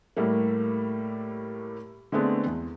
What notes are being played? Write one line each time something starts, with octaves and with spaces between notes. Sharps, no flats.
A2 G3 A3 A#3
D3 G#3 A3 B3 C4 D4
E2